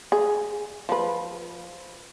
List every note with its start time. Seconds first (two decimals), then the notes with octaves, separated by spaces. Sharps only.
0.12 G#4
0.89 F3 B4